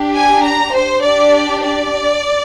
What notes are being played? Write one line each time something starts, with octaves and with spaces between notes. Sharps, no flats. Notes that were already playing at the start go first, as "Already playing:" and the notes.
Already playing: D4 G4
G#5
A#5
C5
D4 G4 D5
D5